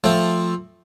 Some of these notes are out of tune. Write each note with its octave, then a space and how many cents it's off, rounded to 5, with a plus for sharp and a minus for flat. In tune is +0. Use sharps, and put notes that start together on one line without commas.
F3 +5 A3 +0 C4 +10